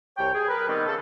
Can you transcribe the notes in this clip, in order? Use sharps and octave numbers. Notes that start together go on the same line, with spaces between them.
C2 C#5 G5
G#4
A#4 B4
D#3 G3 B3 C4
C#3 A4